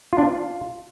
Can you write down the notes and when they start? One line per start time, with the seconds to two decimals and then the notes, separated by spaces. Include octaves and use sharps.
0.13 F4
0.18 D4
0.24 F4